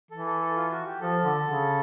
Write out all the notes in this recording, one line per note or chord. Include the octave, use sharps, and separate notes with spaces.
E3 A4
A4
A4
F4
F#4
G4
F3 A4
D3
C#3